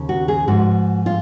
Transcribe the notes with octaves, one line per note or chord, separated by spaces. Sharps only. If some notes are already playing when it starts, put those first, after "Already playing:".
Already playing: D#2 C#3
F#4
G#4
G#2 F3 F#4
F4